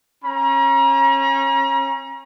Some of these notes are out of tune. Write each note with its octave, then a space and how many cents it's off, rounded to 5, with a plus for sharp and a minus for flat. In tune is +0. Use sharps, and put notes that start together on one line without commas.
C#4 -30 A#5 +35